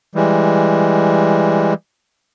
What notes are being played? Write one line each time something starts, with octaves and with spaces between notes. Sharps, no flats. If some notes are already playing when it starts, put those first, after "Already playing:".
E3 G3 G#3